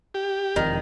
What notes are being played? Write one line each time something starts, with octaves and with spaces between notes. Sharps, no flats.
G4
E1 F2 D#3